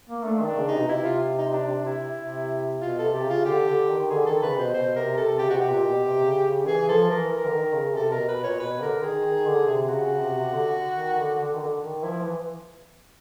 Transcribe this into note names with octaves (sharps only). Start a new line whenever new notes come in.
A#3
A3 D4
D#3
D4
C#3
C3 D#4
B2
C3 E4
F4
D#4
D4
E4
C3
B2 F4
A4
C3
G4
C#3 F4
D3 G4
D3
D#3
D3 G#4
D#3 A4
C#3 B4
B2 C5
B2 C5
C3 A#4
C3 A4
C#3 G4
B2 C3 F#4
G4
A#2
B2
C3
C#3
C#3
E3 G#4
F3 A4
E3 A#4
E3 A#4
D3
D#3
C#3
C3 A4
B2 A#4
B2 B4
A#2 C#5
B2 B4
D3 A#4
D#3 G#4
D#3
D3
C3
C#3 F#4
C#3
C3
C3
D3
D#3
D3
D3
D#3
D3
D#3
F3 E4
F3
E3